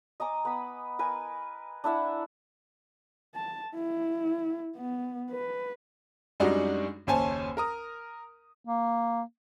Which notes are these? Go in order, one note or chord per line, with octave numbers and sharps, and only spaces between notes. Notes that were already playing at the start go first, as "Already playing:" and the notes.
D#5 G#5 A#5 D6
B3 B5
A#4 B4 G#5
D4 E4 E5 F#5
A5
E4
B3
B4
F#2 G3 G#3 D4 D#4 F#4
F#1 D#2 C#4 C5 G#5 A5
A#4 A#5 D#6
A#3